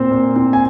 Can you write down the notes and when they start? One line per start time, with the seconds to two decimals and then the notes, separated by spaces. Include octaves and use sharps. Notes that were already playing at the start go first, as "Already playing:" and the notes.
Already playing: A#2 C4 C5
0.11 A#2
0.36 C4
0.53 G#5